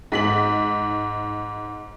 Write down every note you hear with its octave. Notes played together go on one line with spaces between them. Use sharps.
G#2 B6 F#7